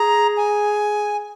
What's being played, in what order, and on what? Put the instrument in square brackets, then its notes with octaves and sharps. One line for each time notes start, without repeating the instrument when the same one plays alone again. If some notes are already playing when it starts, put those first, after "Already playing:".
Already playing: [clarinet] G#4 [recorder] A#5
[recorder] G#5